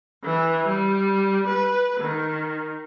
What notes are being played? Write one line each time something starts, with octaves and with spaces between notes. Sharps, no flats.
E3
G3
B4
D#3